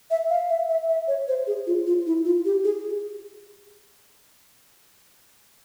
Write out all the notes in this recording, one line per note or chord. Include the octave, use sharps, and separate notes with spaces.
E5
F5
E5
E5
E5
C#5
C5
G#4
F4
F4
E4
F4
G4
G#4